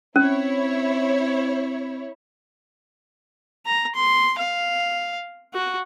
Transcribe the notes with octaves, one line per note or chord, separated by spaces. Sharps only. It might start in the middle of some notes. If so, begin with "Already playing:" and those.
C4 C#4 E4 C#5
A#5
C6
F5
F#4